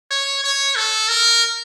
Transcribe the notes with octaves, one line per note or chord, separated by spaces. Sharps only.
C#5
C#5
A4
A#4